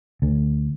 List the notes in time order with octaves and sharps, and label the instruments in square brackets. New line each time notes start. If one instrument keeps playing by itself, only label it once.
[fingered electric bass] D2